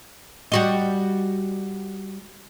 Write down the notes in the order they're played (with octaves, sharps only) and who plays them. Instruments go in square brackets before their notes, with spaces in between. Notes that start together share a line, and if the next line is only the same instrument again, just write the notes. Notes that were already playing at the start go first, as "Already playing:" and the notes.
[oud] G3 F#4 D#5